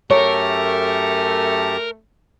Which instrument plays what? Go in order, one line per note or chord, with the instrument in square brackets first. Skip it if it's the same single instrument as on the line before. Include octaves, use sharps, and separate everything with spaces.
[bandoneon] F#2 G4 A5 [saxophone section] A3 [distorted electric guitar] A#4 [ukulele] C#5